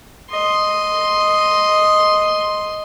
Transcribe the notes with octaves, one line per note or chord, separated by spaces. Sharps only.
D#5 C6